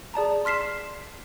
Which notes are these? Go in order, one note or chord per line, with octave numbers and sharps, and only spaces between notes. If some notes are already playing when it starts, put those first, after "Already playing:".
G#4 D5 A5 A#5
C6 F6 B6 C7 E7